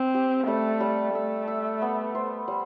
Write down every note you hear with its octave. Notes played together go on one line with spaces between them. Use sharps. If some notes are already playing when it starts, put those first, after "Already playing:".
Already playing: C4
G4
G3 A3
G3
A3 E5
E5
B3
C5
G3